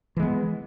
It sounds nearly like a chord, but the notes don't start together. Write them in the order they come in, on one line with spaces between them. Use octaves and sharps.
E3 G#3 B3